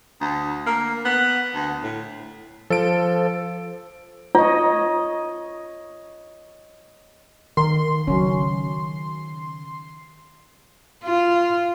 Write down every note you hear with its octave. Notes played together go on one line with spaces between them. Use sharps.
D2
A#3
B3
D2
A2
F3 A4 D7
F4 C#5 D#5
D#3 A#4 C6
C#3 F#3 C#4
F4